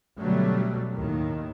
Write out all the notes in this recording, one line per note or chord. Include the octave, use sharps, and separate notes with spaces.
B2 D3 F#3 G3 A3
D#2 A2 D#3